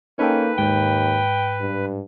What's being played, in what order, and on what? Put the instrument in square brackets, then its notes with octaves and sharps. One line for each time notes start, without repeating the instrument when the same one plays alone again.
[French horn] A#3 [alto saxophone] C#4 [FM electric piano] D#4 A4 G5 [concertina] B4
[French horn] D#2 [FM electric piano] G#2 [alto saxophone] G5
[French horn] G2